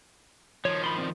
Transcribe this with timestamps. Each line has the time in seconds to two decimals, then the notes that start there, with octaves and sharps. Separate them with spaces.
0.65 D#3 F3 C#5
0.84 B5 C6
0.98 C4 D5